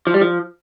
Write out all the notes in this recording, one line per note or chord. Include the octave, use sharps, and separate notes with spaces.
F3
G3
F3